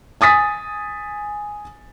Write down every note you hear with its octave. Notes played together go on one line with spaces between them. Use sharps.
G#5 D#6 A6 B6